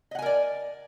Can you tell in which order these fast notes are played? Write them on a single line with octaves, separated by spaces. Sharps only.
D#5 F#5 G#5 A#4 D5